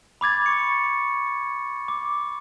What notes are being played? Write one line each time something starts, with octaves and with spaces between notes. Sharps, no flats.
B5 D6 G#6 A6
C#6 C#7
D6